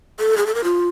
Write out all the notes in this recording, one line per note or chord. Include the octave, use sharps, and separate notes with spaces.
A4
G#4
A4
A#4
F4